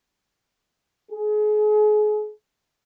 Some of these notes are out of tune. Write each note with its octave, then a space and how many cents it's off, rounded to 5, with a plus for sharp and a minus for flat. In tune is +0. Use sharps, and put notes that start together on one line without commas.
G#4 +35